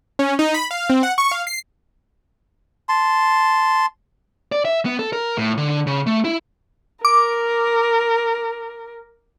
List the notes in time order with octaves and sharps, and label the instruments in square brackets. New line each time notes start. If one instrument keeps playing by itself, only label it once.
[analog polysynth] C#4
D#4
B5
F5
C4
F#5
C#6
F5
C7
[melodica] A5 C6
[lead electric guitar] D5
E5
B3
A4
A#4
A2
D3
C#3
A3
E4
[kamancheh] A#4 [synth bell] D6